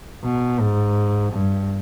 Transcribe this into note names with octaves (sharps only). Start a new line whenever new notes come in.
B2
G#2
G2